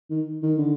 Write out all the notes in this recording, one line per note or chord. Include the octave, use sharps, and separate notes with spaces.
D#3
D#3
D3